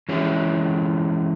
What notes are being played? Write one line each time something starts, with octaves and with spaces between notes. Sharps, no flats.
E3 G#3 C#4 E4